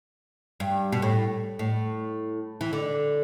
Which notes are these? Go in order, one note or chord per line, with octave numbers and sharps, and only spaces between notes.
G2
B2
A2
A2
E3
D3